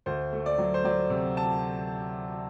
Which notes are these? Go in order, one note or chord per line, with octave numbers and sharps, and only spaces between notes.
D2 C5
A3
D5
F#3
C5
F#3 D5
C3
A5